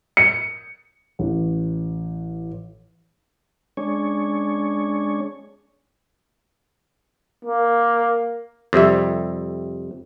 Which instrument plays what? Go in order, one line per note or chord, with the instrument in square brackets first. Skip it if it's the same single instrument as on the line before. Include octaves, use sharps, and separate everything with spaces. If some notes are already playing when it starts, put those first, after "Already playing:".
[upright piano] C#7
[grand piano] A1
[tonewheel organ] G#3 C#4 D4 C#5
[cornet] A#3
[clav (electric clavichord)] F2 C3 G3 E5